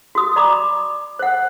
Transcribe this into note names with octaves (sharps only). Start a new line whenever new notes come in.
F#4 D#6
D5 A#5 B5 D6
C5 F#5